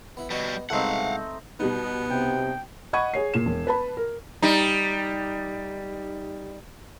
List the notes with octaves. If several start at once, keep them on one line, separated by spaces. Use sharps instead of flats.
B3 E4 E5
G3 B3 F#4 D#5
C2 G#2 B2 A3 C4 D#4 F5 F#5
B2 G3 B3 D#4
C3 G5
D#5 F#5 B5 C#6 G#6 D#7
G#4 C#5 C7
A#2 E7
E1
B4 A5 B5
A#4
G3 D#4